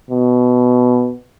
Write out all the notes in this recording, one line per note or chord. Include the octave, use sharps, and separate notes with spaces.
B2